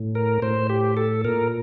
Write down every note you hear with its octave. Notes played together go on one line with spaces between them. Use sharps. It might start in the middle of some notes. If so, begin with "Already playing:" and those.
Already playing: A2
A#4
A2 C5
G4
A4
A#2 A#4